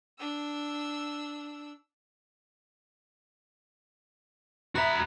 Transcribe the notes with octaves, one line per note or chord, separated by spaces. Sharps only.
D4 E6
F#4 E5 A#5 B5 F#6